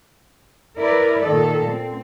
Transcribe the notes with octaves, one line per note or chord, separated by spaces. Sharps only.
E4 A#4 B4 D5
A#2 D#3 A4
C4